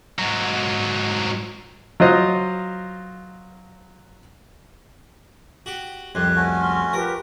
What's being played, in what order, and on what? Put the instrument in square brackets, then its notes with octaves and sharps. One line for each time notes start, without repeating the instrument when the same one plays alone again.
[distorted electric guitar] G#2 F#3
[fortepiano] F#3 F4 C5 D#5
[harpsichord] F#4 G4
[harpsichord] C2 F2 [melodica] G4 C6 [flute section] F#6 G#6
[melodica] A3 C#4 F#4
[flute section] C6 C#6 F6
[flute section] F4 G4 B4 [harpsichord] A#4